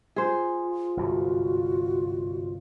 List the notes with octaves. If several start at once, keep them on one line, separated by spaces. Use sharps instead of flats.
F4 G#4 C5
G1 C2 G#2 F#4